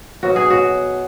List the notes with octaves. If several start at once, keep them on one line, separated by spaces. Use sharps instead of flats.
B2 F#3 F#4
G#4
F#4